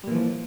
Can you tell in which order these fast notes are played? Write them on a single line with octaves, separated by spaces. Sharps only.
G3 A#2 E3 F3